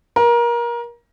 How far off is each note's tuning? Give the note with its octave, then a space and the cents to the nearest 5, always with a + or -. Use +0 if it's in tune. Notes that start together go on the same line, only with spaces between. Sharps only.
A#4 +25